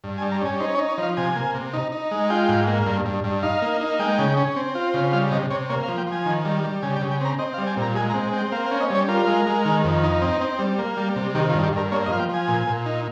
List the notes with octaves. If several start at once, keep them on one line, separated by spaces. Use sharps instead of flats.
G2
G#5
G3
A#5
C#4 G#5
D#4 C5
C#5
D#4
C#5
F3 F5
C3 G#5
A#3
C3
D#4
D#4
G#3
F4 G5
G#2
A#3
G2
G2
G2
D#4 F5
A#3
D#4
G#3 G5
C#3
C#4
C4
F4
C#3
G3 F5
C3 D#5
C3 C#5
A#3 C#5
F5
F3
G5
F3
G#5
D#3
G3
G3
C#3 G#5
G5
C#3
G5
C4 A#5
C4 D#5
F5
G3
G#5
A#2
A#5
G#3 G#5
A#5
C4
C4 G5
A#3 F5
F5
C#4
D#5
G3 C#5
F4 A#4
G#3
G#3
D#3
F2
D#4
C4
C4
G3
A#3
G3
C3
D#3 G4
F4
G2
G4
G2 A#4
A#3 C#5
D#5
F3 F5
G5
F3
G#5
A#2
A#2
D#4